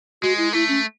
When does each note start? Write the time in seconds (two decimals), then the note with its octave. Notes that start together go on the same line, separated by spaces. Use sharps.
0.22 G#3 F#4
0.38 E4
0.53 A3 E4
0.69 C#4